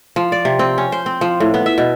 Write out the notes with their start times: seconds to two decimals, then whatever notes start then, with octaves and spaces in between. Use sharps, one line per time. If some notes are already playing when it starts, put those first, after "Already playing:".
0.16 F3
0.32 D5
0.45 C3
0.59 C4
0.78 C#4
0.92 C5
1.06 C4
1.21 F3
1.40 A2
1.54 B3
1.66 E5
1.78 B2